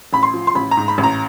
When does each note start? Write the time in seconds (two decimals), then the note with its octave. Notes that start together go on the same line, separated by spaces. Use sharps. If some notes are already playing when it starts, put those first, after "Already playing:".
0.13 A1 B5
0.23 C6
0.34 F3
0.47 C6
0.55 A1 B5
0.71 A#5
0.77 G#2
0.88 B5
0.98 A1
1.04 A#5